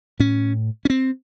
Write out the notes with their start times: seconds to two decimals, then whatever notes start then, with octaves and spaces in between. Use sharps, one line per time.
0.19 A2 C#4
0.85 C#4
0.90 C4